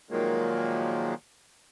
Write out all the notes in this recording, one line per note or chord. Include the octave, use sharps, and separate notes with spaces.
A#2 D#3 F3 F#3 G#3 A#3